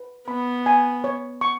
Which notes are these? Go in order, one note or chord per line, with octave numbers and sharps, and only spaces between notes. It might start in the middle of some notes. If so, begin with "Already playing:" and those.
Already playing: B4
B3 B5
G#5
C#5
C#6